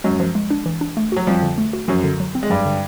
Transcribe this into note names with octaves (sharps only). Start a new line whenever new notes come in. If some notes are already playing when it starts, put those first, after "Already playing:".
F#2 F#3 G#3
F3
G#3
D4
E3
D4
A3
F#3 F#4
F2 F3 G3
D3
A3
F#4
F#2 F3 F#3
D3
F#3
C4
G#3
G2 F#3 G3
D3